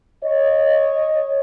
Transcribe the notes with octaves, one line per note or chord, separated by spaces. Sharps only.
C#5 D#5